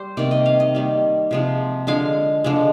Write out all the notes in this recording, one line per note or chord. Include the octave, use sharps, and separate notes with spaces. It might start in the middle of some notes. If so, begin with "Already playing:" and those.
Already playing: G3 C5
C3 D#3 A#3 D5
D#5
F5
D#5
D#3 G3 A#3
C3 F3 G#3
D3 F3 G#3 F5
D3 F3 G#3